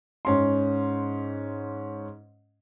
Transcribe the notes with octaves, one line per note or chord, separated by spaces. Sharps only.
G#2 C#4 C6